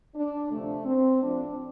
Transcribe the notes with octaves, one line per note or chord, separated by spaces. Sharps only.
D4
D2 C3 F3 A3
C4
A2 F3 D4